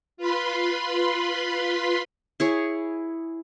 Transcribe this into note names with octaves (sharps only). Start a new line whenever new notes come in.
F4 B4 B5 C6
E4 G#4 C#5